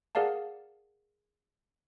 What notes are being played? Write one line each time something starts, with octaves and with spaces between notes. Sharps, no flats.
G#4 A#4 D5 F5 F#5 A5